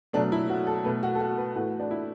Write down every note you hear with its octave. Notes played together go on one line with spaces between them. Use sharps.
B2 F#3 A3 D4
E4
F#4
A4
B2 A3 B4
F#4
A4
F#4
B4
A2 E3 A3 F#4
D4
E4